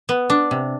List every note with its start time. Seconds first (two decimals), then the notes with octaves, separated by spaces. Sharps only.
0.09 B3
0.30 D4
0.51 C3